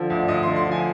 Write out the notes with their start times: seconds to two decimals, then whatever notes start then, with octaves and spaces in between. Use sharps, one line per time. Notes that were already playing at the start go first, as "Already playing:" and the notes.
Already playing: D3 F3
0.10 D2
0.28 D2 D#5
0.43 C6
0.47 D3
0.56 C6
0.66 F3
0.71 G#5